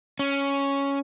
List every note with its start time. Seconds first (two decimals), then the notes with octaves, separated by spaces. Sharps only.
0.19 C#4